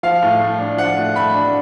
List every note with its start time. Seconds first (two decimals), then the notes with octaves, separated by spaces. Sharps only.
0.03 F3 F5
0.22 A2
0.40 A3
0.59 D4
0.77 F3 F#5
0.96 A2
1.16 A3 B5
1.34 D4